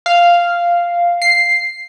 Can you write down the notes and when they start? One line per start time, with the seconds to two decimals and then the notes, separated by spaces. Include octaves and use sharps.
0.06 F5
1.22 C7